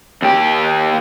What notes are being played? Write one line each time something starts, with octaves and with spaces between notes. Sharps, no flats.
D#2 G4